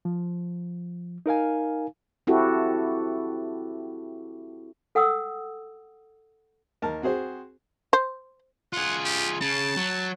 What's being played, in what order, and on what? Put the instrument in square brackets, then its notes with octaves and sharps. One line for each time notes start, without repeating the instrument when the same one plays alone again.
[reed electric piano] F3
D#4 A#4 F5 G#5
[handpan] C4 E4 F#4 G4 A4
[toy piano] A4 F#5 G5 D#6 E6
[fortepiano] D#2 A#4 A5
C4 F#4 G#4 C5
[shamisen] C5
[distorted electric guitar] F4 G#4 [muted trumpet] F#5
[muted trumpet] G4
[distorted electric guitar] C#3 [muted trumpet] A5
[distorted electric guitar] F#3